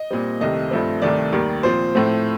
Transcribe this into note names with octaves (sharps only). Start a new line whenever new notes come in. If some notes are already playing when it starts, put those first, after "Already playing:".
Already playing: D#5
A#2 G3 C4
C2 C3 D#3 A3 D#5
G2 F3 A3 C4
C2 C3 D#3 A3 D5
D#2 D#3 G3
A#2 F3 C4 C5
A2 F3 A3 C4